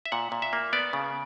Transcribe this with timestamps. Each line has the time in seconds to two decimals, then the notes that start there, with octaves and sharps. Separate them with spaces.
0.05 E5
0.12 A#2 F#5
0.32 A#2
0.42 E5
0.53 A#3
0.73 B3 D5
0.93 C#3